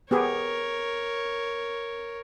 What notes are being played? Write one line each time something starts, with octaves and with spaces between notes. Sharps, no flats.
B3 G4 G#4 A#4 C#5